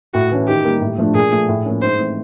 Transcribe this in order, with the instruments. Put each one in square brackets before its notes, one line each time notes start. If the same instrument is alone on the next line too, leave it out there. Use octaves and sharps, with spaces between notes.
[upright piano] A2 [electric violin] F#4
[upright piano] E3 A3 C#4
[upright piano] D#3 [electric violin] G4
[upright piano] G3 A#3
A2
F3 A3 D4
[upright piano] A#2 [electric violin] G#4
[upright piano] F3 A3
A2
F3 A#3 C#4
[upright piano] G#2 [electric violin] C5
[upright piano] E3 A3 C4